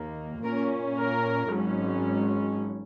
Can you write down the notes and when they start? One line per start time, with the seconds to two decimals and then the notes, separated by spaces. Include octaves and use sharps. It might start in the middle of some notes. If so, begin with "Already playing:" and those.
Already playing: D#2 D#3 A#3
0.42 A#2 A#3 C#4 A#4
0.97 A#4
1.52 G#1 G#2 F#3 C#4